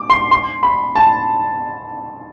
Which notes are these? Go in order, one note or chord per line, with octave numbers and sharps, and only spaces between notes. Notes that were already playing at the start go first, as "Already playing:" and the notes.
Already playing: D6
C6
C6
B5
A5